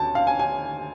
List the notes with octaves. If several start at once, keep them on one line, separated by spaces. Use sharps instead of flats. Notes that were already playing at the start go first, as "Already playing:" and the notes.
Already playing: D2 A5
F5
G#5
G#5